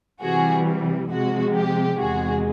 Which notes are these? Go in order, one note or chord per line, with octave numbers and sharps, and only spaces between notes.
C3 E3 G3 F#4 G#4
C3 F3 G#3 F#4
G4
E2 C3 D#3 G#3 F#4 G#4